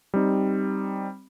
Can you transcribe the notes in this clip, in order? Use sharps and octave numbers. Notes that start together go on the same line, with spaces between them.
G3 C4 D#4